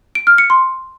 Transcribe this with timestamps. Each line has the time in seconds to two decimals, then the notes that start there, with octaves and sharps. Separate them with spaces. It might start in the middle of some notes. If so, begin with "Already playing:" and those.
0.15 D7
0.27 F6
0.38 C#7
0.50 C6